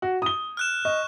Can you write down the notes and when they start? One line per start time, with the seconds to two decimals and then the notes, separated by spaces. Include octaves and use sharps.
0.02 F#4
0.22 D#6 G7
0.57 F6 F#6 E7
0.85 D#5 C#6